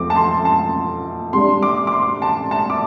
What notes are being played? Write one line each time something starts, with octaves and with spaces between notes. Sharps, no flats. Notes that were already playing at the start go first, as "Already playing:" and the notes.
Already playing: F2 F3 A3 C4 D6
A5
C6
A5
C3 G3 D4 C6
D6
D6
C6
A5
A5
D6